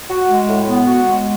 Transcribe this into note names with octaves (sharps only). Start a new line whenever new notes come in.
F#4
G#3
A2
B3
F#4
G#3